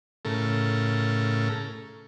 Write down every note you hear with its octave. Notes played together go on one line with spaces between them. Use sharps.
A2 C#3 A4 A#4